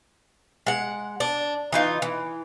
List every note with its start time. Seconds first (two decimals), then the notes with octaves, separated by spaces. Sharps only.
0.67 G#3 F#5
1.20 D4
1.72 E3 D#4 F4
2.02 E3